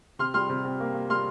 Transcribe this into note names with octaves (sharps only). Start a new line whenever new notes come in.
C3 C6 F6
G3 C6 F6
C3
C3
A#3
A#3
G3 C6 F6